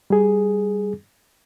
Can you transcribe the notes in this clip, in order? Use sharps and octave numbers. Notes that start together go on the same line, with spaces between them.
G3 G#4